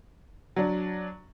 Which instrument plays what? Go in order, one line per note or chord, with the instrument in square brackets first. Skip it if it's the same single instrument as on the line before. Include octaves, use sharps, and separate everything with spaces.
[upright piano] F#3 D4